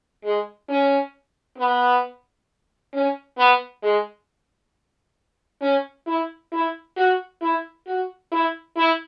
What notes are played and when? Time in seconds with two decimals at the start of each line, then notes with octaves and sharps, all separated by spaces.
0.24 G#3
0.69 C#4
1.58 B3
2.93 C#4
3.38 B3
3.83 G#3
5.62 C#4
6.07 E4
6.52 E4
6.97 F#4
7.41 E4
7.87 F#4
8.32 E4
8.76 E4